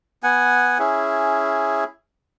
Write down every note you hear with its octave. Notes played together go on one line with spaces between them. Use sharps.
B3 F#5 G#5
C#4 E4 G#4